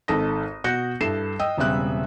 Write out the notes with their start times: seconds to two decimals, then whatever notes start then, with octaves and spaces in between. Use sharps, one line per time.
0.08 G#1 D#4 A4 A5 D#6 A#6
0.64 B2 F#4 F#6 G6 A#6 C#7
1.01 G2 E4 A4 C7 E7
1.39 D#5 G5 D#6 E6
1.57 E1 C#3 G3 C4 E5 F#6